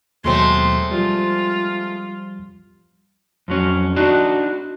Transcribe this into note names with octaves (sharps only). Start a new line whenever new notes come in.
D#2 B2 F#3 G#3 A3 C4 C6
F3 G3 F4
F2 F#3 C#4
D4 D#4 F#4